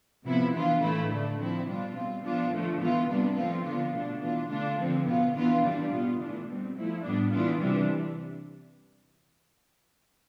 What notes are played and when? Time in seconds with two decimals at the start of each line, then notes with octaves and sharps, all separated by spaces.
0.25 C3 F3 B3 E4
0.53 E3 B3 D4 F4
0.81 A2 E3 A3 E4
1.09 D3 A3 D4
1.38 F3 C4 E4
1.66 B2 G3 D4 F4
1.94 B2 G3 C4 F4
2.23 F3 B3 D4 F4
2.51 D3 F3 A3
2.80 E3 B3 F4
3.07 C3 G3 B3 D4
3.36 F3 A3 C4 F4
3.64 D3 F3 B3 D4 F4
3.93 B2 A3 D4
4.21 E3 B3 D4 F4
4.49 D3 A3 D4 F4
4.77 D3 F3 C4
5.06 B2 B3 F4
5.34 E3 B3 D4 F4
5.62 E3 G3 D4
5.90 B2 B3 F4
6.20 E3 A3 D4
6.47 B2 G3 C4
6.75 F3 A3 E4
7.03 A2 G3 B3 D4
7.32 E3 B3 D4 F4
7.60 C3 E3 G3 D4